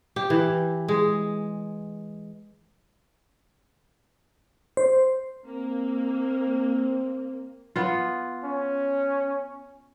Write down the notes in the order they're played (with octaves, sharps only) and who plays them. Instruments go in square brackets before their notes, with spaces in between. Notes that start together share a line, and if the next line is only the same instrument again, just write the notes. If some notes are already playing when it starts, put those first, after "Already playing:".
[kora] G4
E3
G#3
[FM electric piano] C5
[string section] A#3 [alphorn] C4
[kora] B3 F4
[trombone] C#4